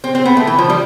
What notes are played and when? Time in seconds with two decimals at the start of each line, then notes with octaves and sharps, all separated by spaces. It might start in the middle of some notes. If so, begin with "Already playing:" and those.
0.04 C4
0.15 C4
0.25 B3
0.37 A3
0.47 E3
0.58 F3
0.70 G3